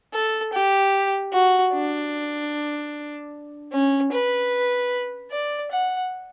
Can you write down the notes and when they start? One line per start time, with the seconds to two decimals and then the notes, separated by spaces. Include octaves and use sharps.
0.14 A4
0.53 G4
1.33 F#4
1.73 D4
3.73 C#4
4.12 B4
5.32 D5
5.71 F#5